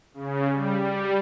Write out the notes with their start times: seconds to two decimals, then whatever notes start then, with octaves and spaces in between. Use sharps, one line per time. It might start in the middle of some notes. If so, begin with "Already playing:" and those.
0.14 C#3
0.51 G3
0.81 G3